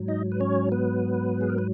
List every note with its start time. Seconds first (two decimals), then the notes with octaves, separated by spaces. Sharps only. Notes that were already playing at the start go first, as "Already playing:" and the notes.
Already playing: G#2 F#3
0.08 D#4 D#5
0.32 B4
0.40 C#4 C#5
0.72 B3 B4
1.41 G#4
1.49 A#4
1.58 B4